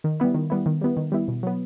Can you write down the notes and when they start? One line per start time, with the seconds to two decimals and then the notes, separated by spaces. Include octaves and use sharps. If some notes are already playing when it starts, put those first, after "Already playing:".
0.04 D#3
0.20 G3 B3 E4
0.34 D#3
0.50 G3 B3 E4
0.66 D#3
0.81 G3 B3 E4
0.97 D#3
1.12 G3 B3 E4
1.28 B2
1.43 F#3 B3